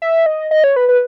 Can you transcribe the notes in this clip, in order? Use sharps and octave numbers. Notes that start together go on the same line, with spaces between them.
E5
D#5
D#5
C#5
B4
B4